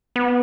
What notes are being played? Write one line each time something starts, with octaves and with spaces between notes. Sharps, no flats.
B3